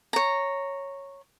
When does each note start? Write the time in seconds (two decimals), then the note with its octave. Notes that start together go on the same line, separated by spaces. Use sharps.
0.13 C#5 A#5